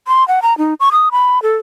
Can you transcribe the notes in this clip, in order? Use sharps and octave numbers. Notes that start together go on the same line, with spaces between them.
C6
F#5
A#5
D#4
C#6
D#6
B5
A4